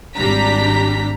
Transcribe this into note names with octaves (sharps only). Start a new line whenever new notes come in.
G#1 G3 D4 A#5 B6